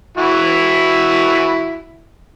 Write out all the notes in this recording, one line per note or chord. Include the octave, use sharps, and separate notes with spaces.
E3 E4 F#4